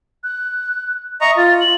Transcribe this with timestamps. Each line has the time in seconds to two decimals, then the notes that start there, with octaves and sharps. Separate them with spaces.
0.24 F#6
1.21 D#5 E5 A#5 C#6
1.37 F4 A6
1.61 F#7